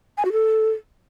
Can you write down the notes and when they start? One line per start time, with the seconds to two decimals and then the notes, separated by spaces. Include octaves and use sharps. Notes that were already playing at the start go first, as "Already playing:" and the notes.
0.18 G#5
0.25 F#4
0.33 A4